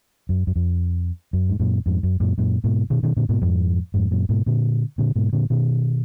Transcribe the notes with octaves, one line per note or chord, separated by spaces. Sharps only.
F#2
F#2
F2
F#2
G#2
F#2 A#2
F2 G#2
F#2
F#2 A#2
F#2 A#2
G#2 B2
B2 D#3
B2 D#3
A#2 D3
G#2 B2
F2 G#2
F2 G#2
F#2 A#2
G#2 B2
A#2 D3
A#2 D3
G#2 B2
A#2 D3
B2 D#3